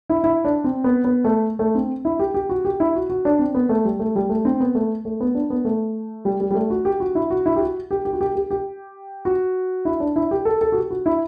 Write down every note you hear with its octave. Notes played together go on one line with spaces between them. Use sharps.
E4
E4
D4
C4
B3
B3
A3
A3
C4
E4
G4
G4
F#4
G4
E4
F#4
F#4
D4
C4
B3
A3
G3
A3
G3
A3
C4
B3
A3
A3
B3
D4
B3
A3
G3
G3
G3
A3
F#4
G4
F#4
E4
F#4
E4
G4
F#4
G4
G4
F#4
G4
G4
G4
F#4
E4
D4
E4
G4
A4
A4
F#4
G4
F#4
E4